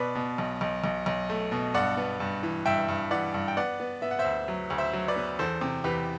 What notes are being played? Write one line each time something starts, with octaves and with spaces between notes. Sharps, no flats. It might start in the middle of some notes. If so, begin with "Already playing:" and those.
Already playing: B2 B4 D5
B2
B1
B1
B1
B1
A3
B2
G2 D5 F#5
B3
G2
E3
G2 E5 G5
G2
E3 D5 F#5
G2
G5
B3 D5 F#5
B3
B3 E5
F#5
C5 E5
D2
F#3
D2
C5 E5
F#3
B4 D5
B3
E2 A4 C5
C3
E2 G4 B4